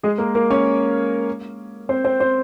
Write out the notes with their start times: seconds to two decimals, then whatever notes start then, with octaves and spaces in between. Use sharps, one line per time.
0.03 G#3 G#4
0.18 A#3 A#4
0.35 A#3 A#4
0.50 C#4 C#5
1.89 C4 C5
2.05 C4 C5
2.20 C4 C5